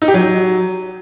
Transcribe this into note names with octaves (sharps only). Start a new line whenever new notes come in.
D#4
G4
F#3